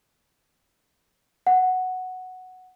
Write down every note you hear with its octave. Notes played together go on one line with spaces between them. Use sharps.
F#5